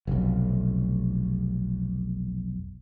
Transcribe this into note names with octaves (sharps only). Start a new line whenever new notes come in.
F1 B1